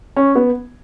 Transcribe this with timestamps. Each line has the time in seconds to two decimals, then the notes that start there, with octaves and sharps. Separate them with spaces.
0.16 C#4
0.36 B3